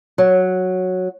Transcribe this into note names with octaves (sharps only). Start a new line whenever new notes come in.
F#3